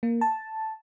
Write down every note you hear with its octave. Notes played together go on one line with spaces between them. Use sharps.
A#3
A5